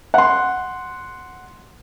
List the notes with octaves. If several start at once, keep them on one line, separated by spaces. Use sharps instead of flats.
F#5 C6